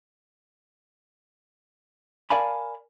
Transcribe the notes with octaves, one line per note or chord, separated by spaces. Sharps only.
A#4 D5 F5 G#5 A5 B5